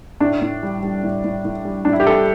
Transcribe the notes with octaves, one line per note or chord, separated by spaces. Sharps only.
A2 D4
A2
G3
G3
A2
A2
A2
G3
A2 D4
E4
G4
G3 A4